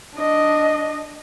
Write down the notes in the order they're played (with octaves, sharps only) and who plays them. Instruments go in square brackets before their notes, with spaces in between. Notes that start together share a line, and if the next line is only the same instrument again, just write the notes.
[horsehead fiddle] D4 D#5